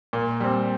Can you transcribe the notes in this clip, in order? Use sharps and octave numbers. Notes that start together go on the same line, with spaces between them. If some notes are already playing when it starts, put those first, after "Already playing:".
A#2
G3 C4